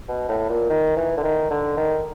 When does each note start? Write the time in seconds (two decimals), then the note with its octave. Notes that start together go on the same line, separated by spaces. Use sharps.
0.08 B2
0.29 A2
0.49 A#2
0.69 D#3
0.96 E3
1.17 D3
1.23 D#3
1.50 D3
1.77 D#3